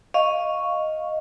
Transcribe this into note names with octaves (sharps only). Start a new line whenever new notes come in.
D#5 F5 C#6